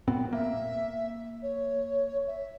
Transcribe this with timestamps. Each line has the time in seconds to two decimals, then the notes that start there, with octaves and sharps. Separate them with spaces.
0.08 A#2 B3 C4
0.33 A#3 E5
1.42 C#5
2.26 E5